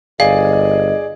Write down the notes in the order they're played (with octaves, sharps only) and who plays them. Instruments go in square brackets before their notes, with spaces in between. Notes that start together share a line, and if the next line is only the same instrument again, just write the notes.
[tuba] G1 [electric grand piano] G#4 D5 G#5 [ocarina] D#5 [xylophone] F5